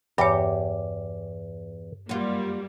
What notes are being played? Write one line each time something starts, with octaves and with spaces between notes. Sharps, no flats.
E2 G2 G4 C#5
F#2 G3 A#3 F4